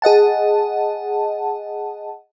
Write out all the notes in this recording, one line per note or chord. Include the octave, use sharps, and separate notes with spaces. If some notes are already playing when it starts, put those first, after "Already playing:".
G#4 D#5 F#5 A5